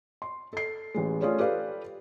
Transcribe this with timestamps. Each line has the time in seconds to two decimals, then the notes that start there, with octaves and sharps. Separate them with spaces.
0.22 C6
0.53 A4 C7
0.94 A1 G#3
1.21 A3 C#4 D4 F4 G#4
1.39 G4 A4 B4 D5 F5